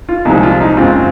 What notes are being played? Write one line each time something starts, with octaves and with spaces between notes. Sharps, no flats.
F4
C2 A#2 F3 G#3 D#4
F4
D#4
F#2 C#3 G#3 C4 F4